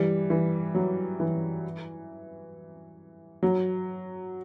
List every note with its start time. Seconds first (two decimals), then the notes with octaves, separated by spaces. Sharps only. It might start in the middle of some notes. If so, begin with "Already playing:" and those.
Already playing: E3 G3
0.30 E3
0.75 F#3
1.20 E3
3.43 F#3